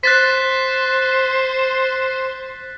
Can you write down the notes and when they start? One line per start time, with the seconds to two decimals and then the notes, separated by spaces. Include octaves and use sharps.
0.03 C5 F#6 A6 B6